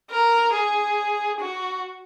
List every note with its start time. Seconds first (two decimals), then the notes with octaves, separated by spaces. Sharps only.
0.10 A#4
0.53 G#4
1.40 F#4